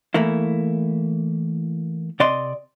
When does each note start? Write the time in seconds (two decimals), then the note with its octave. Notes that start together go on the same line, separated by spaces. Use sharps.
0.14 E3 A3 A#3 E4
2.20 C3 D5 D#5 C6